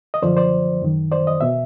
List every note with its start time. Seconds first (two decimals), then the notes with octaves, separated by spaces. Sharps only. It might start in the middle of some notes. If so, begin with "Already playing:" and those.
0.14 D#5
0.22 F#2 D3 F3 C5 D5
0.37 C5 D5
0.82 F#2 D#3
1.12 C5 D5
1.27 D#5
1.41 B2 E5